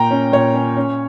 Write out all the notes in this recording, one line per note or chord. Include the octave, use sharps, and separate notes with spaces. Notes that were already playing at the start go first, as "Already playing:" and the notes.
Already playing: A#2 G5 A#5
C#4
A#2 C#5
C#4
C#4